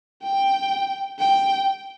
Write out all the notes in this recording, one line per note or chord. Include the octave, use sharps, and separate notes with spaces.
G5
G5